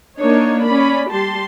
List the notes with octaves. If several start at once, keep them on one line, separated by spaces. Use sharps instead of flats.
A#3 D4 D#4 C#5
C#4 D5 B5
G3 G4 A5 C6